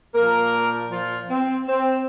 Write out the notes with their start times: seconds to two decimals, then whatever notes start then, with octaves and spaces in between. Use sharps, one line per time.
0.14 A#2 F3 A#3 A#4
0.91 F3 F4
1.29 C4
1.67 C4